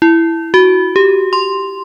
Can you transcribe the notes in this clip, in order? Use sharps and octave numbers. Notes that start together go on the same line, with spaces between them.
E4
F#4
G4
C6